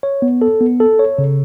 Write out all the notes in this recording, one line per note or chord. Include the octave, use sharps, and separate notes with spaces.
C#5
B3
A4
B3
A4
C#5
C#3